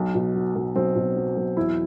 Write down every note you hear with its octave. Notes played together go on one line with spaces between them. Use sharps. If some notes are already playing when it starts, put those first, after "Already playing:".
Already playing: B1
B2
F#3
B1
B1 C4
B2
F#3
B1
E2 E4